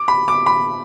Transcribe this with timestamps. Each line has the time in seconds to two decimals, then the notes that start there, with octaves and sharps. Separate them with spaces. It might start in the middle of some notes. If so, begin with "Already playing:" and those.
Already playing: D6
0.08 B5
0.28 D6
0.46 B5